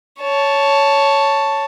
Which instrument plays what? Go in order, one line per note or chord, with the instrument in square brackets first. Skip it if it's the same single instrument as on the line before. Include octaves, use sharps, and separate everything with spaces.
[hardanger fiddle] C#5 A5